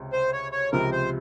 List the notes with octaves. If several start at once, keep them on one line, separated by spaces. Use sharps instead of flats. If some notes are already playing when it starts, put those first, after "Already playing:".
Already playing: C#2 C3
C5
C#5
C#5
C#2 C3 F3 A#4
C5